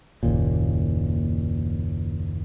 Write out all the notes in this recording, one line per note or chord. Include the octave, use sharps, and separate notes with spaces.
F#1 D#2 A#2